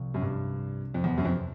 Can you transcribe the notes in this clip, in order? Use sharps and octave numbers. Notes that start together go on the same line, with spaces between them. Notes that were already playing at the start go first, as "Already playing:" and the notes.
Already playing: C2 C3 F3
F#2
G2
F2
E2
F#2
F2